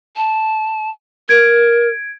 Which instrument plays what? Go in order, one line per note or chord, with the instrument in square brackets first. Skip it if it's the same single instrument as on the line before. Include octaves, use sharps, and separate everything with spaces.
[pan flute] A5
[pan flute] A#4 [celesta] G#6 D7